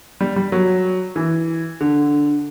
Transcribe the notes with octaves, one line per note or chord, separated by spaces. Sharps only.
G3
G3
F#3
E3
D3